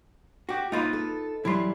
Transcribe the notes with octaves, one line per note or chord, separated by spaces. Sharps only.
F#4 G4
A#3 D#4 F4 B4
A4
E3 F#3 G3 E4 C6